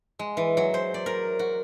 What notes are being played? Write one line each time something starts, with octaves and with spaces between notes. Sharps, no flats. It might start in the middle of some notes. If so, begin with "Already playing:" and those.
G#3
E3
F#3
C5
D5
A#4
F#4